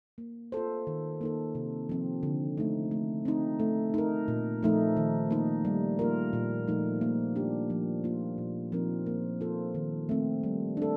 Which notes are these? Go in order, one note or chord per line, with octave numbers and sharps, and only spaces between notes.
A#3
F4 A4 C5
D#3
A#3 D#4 A4
C3
F3 C4
D3
A3 D#4
A3
C4 D#4
A3
D#4 A#4
A#2
F3 A3 D#4
D#3
A#3 D#4
G3
A#3 F4 A#4
A#2
F3 A3 D#4
A#3
D4 G4
F3
A#3 F4
A#2
F3 C4 D#4 A#4
A#3
F4 A4 C5
D#3
A3 C4
G3
D4 A4